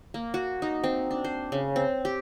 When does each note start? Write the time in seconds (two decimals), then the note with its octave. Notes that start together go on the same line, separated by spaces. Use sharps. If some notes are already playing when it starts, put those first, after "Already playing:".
0.14 A#3
0.34 F#4
0.62 D#4
0.84 C4
1.11 D4
1.24 C5
1.52 C#3
1.76 C4
2.05 G4